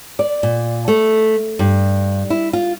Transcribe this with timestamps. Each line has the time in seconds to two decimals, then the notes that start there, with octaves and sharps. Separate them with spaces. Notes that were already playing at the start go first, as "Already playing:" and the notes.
0.19 D5
0.43 A#2
0.88 A3
1.59 G2
2.30 E4
2.53 F4